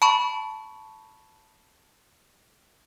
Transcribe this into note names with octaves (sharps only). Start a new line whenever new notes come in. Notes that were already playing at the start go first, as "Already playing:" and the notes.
A5 B5 C#6